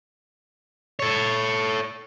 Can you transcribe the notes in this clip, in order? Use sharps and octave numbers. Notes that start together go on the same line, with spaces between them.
A4 C#5